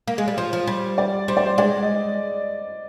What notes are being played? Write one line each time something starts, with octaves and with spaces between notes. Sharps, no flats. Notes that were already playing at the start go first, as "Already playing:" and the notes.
A#3
G#3
G3
F3 C5
F3
G3
D5
G3 C5
D5
C5
G#3 D5
D#5